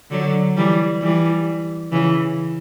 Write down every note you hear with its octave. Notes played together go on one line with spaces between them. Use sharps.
D3 F#3
E3 G3
E3 G3
C#3 E3